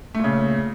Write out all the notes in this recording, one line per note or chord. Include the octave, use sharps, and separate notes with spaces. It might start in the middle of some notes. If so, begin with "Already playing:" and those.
A#2 C#3 A3